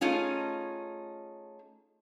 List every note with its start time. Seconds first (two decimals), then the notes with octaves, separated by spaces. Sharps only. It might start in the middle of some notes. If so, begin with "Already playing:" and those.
0.01 A3 C#4 D#4 F4 G#4